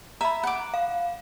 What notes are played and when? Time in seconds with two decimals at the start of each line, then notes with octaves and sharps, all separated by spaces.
0.21 E5 A#5 B5
0.43 F#5 D6
0.74 F5